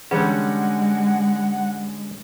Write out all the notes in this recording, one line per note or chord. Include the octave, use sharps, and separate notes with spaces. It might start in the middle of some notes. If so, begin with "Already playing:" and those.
D3 E3 G3 G#3 C#4 G#4 F#5